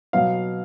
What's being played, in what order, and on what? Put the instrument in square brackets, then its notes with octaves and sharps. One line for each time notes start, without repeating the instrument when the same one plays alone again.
[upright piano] B2 F#3 B3 F5